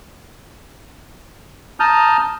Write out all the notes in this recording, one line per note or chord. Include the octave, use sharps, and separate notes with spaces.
A5 A#5 D#6 F6 G6